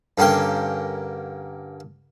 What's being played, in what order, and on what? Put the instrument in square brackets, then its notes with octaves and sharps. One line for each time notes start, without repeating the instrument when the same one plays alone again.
[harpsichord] G2 D3 A#3 C#4 G5 C#6